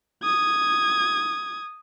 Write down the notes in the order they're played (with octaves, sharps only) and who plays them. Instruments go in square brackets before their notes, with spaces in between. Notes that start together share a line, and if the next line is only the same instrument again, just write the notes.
[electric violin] D#6 G#6